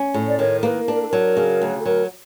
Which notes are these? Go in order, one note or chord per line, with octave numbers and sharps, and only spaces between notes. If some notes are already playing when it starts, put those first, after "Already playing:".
Already playing: C#4
A2
D5
D#3 C#5
A#3 B4
D4 B4
A#4
A4
F#3 A#4
C#3
D2
A4
F#3 A#4